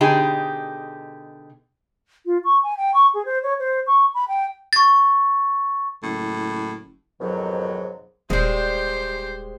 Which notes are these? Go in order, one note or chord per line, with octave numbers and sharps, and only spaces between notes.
B2 D3 D#4 G4 G#4
F4
C#6
G#5
G5
C#6
G#4
C5
C#5
C5
C#6
B5
G5
C#6 A6
F#1 A2
F2 G#2 B2 D#3 F#3
D#1 G3 G#3 G4 C5